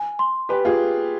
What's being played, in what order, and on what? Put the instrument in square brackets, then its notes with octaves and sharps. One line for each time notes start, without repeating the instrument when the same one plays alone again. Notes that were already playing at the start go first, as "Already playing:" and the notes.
Already playing: [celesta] G#5
C6
[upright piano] G4 B4 [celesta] G#5
[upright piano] F4 G#4